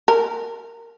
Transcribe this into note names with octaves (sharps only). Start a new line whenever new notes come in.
A#4